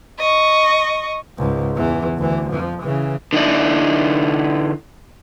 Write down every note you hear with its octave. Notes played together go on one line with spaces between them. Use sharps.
D#5 C#6
C#2 G#2
E2 E3
D2 E3
F2 F3
C#3 E3
D3 D#4 E4 D5